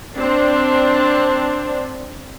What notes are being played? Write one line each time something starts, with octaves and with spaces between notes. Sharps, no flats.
C4 D4